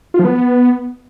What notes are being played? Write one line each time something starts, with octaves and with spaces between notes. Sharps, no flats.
F4
F3
B3